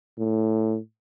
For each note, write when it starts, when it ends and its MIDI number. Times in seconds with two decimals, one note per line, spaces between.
0.18 0.77 45